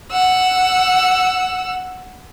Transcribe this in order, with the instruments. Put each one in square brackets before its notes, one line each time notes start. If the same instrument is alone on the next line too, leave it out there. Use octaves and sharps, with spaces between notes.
[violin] F#5 E6